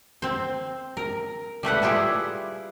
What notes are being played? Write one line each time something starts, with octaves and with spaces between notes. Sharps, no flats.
C4 C5
A#4
G3 A3 B4 F#5
G3 E4 F4 G4 G#4